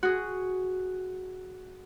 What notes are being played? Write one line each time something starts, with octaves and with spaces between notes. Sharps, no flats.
F#4 G#4